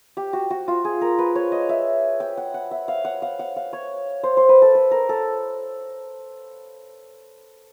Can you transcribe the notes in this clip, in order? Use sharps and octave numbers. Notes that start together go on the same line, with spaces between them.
G4
F#4
F#4
F4
G#4
A#4
B4
C#5
D#5
E5
G5
F#5
F#5
E5
F5
F#5
F5
F#5
F5
C#5
C5
C5
B4
A4
A4
A#4
A4